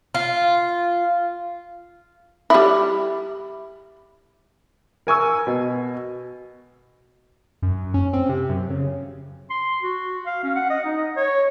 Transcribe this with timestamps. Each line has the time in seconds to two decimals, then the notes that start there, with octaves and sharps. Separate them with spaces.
0.14 F4
2.50 G3 E4
5.07 A#4 G#5 C#6 E6
5.47 B2
7.62 F#2
7.94 C#4
8.13 C4
8.29 C3
8.49 F#2
8.70 C#3
9.50 C6
9.82 F#4
10.26 F5
10.43 C#4
10.56 F#5
10.70 D#5
10.85 D#4
10.97 D#5
11.16 C#5